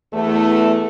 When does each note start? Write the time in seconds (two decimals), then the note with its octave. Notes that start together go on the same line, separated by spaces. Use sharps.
0.13 E2 A3